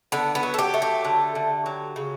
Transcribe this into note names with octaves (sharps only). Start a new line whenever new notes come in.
D3 B3
B3
F#3
A4
G4
A3
G4
D3
D3
F#3
C#3